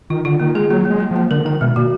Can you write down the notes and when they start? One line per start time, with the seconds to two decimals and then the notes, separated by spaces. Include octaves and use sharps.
0.10 D#3 F4
0.25 D3 F4
0.40 D#3 A#3
0.55 G#3 G#4
0.70 F#3 A#3
0.85 G#3 A#3
1.00 A#3
1.11 F3
1.16 A#3
1.31 D3 A#4
1.45 D#3 A#4
1.61 B2 G#3
1.76 A#2 F#4